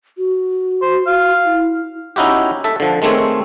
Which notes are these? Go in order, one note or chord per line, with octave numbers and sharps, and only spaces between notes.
F#4
C5
F#4 F5
E4
C#4 D#4 E4 F#4 G4
A4 E5
D3 F3
D#3 G#3 A3 C4 C#5